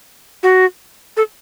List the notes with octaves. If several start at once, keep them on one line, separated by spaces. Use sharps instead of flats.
F#4
A4